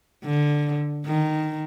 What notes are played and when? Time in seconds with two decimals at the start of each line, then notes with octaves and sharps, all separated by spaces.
0.25 D3
1.05 D#3